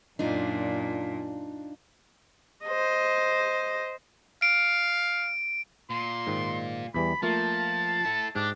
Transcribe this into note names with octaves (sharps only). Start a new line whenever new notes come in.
F#2 A#2 D4 D#4 F4
C5 D#5
F5 D7
A#2 C6
G#2 D#3
E2 E3 G3 B5
F3 A3 A#3 F4 A5
E4 A4
G#2 D4 G4